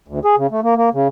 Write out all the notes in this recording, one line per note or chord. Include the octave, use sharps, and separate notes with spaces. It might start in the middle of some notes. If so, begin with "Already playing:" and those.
D2
G#4
C#3
A3
A#3
A#3
C#3